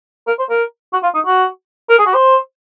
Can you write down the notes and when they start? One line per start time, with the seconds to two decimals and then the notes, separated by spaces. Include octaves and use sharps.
0.27 A#4
0.39 C5
0.50 A#4
0.93 F#4
1.03 F4
1.14 D#4
1.25 F#4
1.89 A#4
1.98 G#4
2.06 F#4
2.14 C5